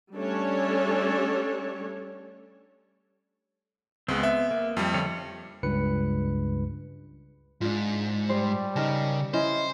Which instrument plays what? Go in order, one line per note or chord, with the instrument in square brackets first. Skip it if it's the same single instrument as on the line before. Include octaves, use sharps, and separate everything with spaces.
[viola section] G3 A3 C#4 D4 A4 C#5
[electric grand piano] C#2 G#3 [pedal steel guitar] B3 C4
[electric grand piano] E5
[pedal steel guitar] A#3
[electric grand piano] F2 G3
[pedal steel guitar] D3 F4 C#5
[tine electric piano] C#2 G2 B4 C#7
[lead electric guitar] G#2 [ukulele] D4 F4
[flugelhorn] G3 [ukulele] C5
[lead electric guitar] C#3 [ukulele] D#4 A#4 A5
[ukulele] C#4 E4 D#5 [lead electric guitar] C5